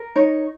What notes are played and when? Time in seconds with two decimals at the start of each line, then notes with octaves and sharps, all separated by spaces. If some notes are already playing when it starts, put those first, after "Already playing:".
Already playing: A#4
0.15 D#4 C#5